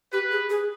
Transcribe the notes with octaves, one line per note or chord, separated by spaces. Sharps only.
G4 B4
G#4
G#4